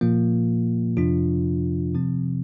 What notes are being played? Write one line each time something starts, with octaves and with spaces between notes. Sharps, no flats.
A#2 F3 A#3 F4
F2 C3 F3 D4 F4
C3 F3 C4